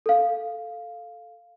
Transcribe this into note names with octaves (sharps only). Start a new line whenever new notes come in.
A4 F5